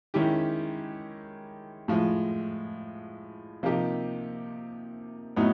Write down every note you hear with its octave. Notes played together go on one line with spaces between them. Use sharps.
D#3 G#3 C#4 E4 G4
A2 F3 G#3
C3 F3 A#3 D#4 G4
A2 F#3 B3 D#4